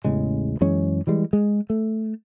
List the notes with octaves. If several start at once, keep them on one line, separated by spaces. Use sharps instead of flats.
A1 E2 C#3 G#3
F#2 E3 G#3 C#4
E3 G3 G#3
G#3
A3